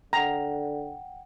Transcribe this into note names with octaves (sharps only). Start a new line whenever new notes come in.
D3 F#5 G5 A#5